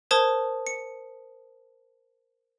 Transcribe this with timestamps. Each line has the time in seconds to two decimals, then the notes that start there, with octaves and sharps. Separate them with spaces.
0.11 A#4 C5 A5 D#6 G#6 G7
0.67 C#7